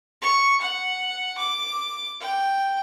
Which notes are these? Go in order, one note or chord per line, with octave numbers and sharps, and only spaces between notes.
C#6
F#5
D6
G5